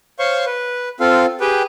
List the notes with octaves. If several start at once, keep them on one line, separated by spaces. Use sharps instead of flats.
C5 C#5 F5 C6 C#6
B4
C4 F4 A4 F5
G4 G#4 B4 G5